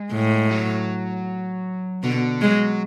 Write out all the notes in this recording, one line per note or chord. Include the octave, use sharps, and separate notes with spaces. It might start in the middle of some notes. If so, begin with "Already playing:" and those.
Already playing: G#3
A2
F#3
B2 D3
F#3 G#3